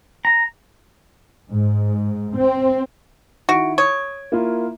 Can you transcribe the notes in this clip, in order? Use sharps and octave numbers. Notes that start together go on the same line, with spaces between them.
A#5
G#2
C4
D#3 E4 F#4 D7
C#5 D#6
A#3 E4 F4